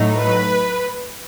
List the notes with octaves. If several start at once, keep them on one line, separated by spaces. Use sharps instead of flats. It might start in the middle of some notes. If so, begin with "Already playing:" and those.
Already playing: A2 F#3 A3 D#4
B4